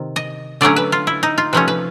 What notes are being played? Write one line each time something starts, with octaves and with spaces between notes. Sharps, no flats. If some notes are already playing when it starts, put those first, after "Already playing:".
Already playing: C3 D#3
D#5
D3 F#3 A3 C#4 D5
B4
F4
E4
D#4
F4
C3 F3 A3 C#4 B4
B4